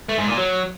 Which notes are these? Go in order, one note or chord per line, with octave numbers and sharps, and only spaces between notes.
A3
G#2
A#2
F#3